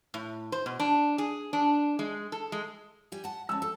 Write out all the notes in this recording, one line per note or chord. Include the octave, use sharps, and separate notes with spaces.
A2
C5
B2
D4
G#4
D4
G#3
A4
G#3
G3 G4 G#5
F#5 A5
G#3 C#4 A5 E6
A4